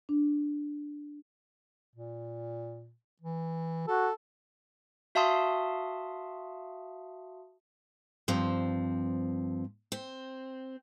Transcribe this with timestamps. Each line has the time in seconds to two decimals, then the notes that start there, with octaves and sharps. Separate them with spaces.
0.09 D4
1.96 A#2
3.22 E3
3.88 F#4 A4
5.15 F#4 E5 F5 A5 C6 D#6
8.28 G2 F3 C4
9.92 C4